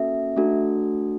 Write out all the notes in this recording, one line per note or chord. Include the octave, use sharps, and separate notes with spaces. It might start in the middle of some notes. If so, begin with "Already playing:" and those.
Already playing: A#3 C#4 F#4 A4 E5
A3 D4 F#4 A4